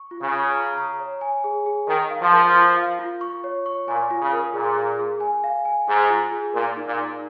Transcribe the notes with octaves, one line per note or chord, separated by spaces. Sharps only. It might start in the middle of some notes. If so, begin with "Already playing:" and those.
Already playing: C#6
F4
C#3
C#6
A#5
A#5
C#5
G#5
G#4
G#4
D#3 A#4
F5
F3
A#4
F4
F5
F4
C#6
C#5
C#6
A#2 G#5
F4
C#3
A#4
A#2 G#4
G#4
G#4
G#5
F5
G#5
G#2 G#4
F4
G#4
A#2 A#4
D#4
A#2
D#4